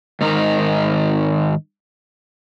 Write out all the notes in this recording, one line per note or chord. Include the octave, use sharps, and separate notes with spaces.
G#2 D#3 D#4 A#4